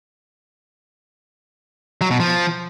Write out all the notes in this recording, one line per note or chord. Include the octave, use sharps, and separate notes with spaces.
F#3
B2
F3